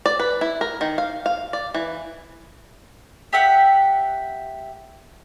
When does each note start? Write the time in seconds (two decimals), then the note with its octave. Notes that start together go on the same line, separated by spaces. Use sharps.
0.06 D5
0.20 B4
0.41 E4
0.61 A#4
0.81 D#3
0.98 F5
1.26 F5
1.53 D5
1.74 E3
3.33 G4 E5 F#5